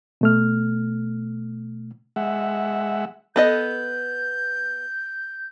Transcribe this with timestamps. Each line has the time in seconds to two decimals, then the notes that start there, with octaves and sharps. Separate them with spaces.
0.21 B2 A3 F6
2.16 G#3 E5 F#5
3.36 B3 A4 D#5 G6